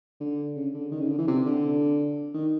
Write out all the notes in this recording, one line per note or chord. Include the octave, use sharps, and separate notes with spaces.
D3
C#3
D3
D#3
C#3
D3
E3
C3
D3
D#3